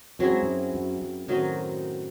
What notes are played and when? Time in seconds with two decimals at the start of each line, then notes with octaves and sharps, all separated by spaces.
0.19 F#2 F#3 C4 E4 G#4
0.30 G#2
0.42 F#2
0.74 F#2
1.01 F#2
1.28 F#2 A2 D#3 F#3 C4 D#4